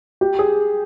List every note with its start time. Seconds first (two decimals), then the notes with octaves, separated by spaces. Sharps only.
0.21 G4
0.39 G#4